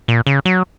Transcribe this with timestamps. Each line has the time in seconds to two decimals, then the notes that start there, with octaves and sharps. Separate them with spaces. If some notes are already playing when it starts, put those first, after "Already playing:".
0.08 A#2
0.27 C#3
0.45 F#3